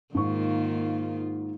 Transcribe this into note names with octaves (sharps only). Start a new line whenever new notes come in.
G#2 D#3 A#3 F4 C#6